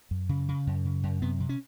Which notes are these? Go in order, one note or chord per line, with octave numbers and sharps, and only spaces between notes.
F#2
C#3
C#3
F#2
C#3
F#2
C3 B3
C3
C#4